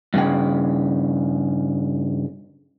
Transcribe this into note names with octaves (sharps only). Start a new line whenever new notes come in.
G2 C#3 G5